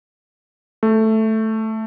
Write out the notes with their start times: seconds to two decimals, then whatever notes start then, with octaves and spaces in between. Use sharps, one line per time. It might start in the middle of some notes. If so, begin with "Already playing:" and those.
0.83 A3